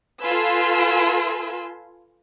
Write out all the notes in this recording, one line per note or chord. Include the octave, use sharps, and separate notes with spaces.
F4 A4 B4 G#5 C6 E6